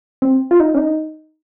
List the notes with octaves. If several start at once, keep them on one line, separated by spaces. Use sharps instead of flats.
C4
F4
D#4
C#4
D#4